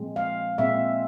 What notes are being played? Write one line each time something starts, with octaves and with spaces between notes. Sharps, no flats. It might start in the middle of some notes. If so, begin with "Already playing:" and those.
Already playing: A#2 F3 G#3 C4
F5
A#2 G#3 C4 E5